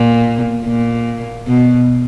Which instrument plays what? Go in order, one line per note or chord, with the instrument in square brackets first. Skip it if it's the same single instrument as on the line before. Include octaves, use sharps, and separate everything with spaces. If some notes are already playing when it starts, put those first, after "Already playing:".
Already playing: [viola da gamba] A#2
A#2
B2